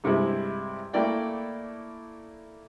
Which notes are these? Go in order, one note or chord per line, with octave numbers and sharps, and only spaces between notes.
G2 C3 G3 G#3 E4
A3 A#3 E4 D5 G5